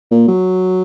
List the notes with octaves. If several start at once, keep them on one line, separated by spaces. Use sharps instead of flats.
A#2
F#3